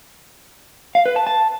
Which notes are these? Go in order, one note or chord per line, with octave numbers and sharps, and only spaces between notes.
F5
B4
A5
A5